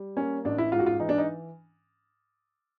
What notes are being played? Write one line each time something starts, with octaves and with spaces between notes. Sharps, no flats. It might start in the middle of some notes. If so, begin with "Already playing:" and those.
Already playing: G3
A#3 C#4
A1 D4
E4
G#2 F4
F#4
F4
E3 D#4
D4
D#4